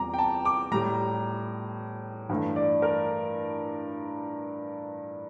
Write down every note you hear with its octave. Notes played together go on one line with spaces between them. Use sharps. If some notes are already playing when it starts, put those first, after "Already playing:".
Already playing: E2 C3 G3 A#5 D6
G5
A5
D6
A2 G3 A#5
G2 E3 A3
D5
A#4